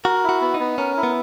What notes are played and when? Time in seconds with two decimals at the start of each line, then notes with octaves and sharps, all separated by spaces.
0.04 F#4 A#4
0.24 E4 F#4
0.41 B3
0.54 D#4
0.60 B3
0.78 C#4 A#4
0.97 E4
1.03 B3